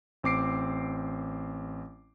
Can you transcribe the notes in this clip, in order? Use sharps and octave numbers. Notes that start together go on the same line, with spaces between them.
A1 C4 D6 C7 D7